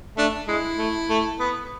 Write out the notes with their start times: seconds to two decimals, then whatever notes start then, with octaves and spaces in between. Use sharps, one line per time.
0.17 A3 D4
0.48 G#3 E4
0.78 A3
1.09 A3
1.40 B3